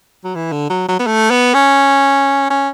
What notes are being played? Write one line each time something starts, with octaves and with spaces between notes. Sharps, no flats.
F#3
E3
D3
F#3
F#3
B3
A3
B3
C#4
C#4